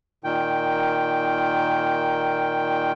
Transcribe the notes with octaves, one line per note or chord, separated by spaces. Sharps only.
A#2 D#3 G5